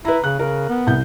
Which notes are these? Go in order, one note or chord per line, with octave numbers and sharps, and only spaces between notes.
E4 B4 A#5
C#3 F#6
C#3 A#4
B3
C2 G6